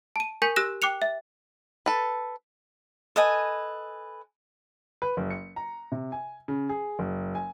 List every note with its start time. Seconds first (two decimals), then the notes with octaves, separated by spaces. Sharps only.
0.16 A5 D#7
0.42 A#4 G#5 C#6 G6 B6 D#7
0.56 G4 E6 F#6 A#6 E7
0.82 G5 D6 F#6 C#7 F7
1.02 E5
1.86 A4 B4
3.16 A4 B4 D#5 G#5
5.02 B4
5.17 F#1
5.31 C#7
5.56 A#5
5.92 C3
6.12 G#5
6.48 C#3
6.69 G#4
6.99 F#1
7.35 G#5